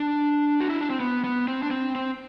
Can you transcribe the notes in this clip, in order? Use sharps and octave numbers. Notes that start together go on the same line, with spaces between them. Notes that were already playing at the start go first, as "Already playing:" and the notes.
Already playing: D4
F#4
E4
D4
C4
B3
B3
C4
D4
C4
C4